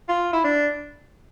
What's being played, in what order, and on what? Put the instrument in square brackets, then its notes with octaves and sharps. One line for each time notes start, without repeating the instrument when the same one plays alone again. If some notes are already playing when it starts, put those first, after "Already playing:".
[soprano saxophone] F4
E4
D4